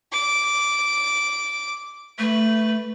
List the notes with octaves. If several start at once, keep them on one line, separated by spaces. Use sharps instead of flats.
D6
A3 B4